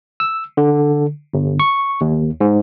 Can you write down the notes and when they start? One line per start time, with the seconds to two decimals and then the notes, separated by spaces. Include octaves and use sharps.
0.20 E6
0.57 D3
1.34 G1
1.60 C#6
2.01 D#2
2.41 G#2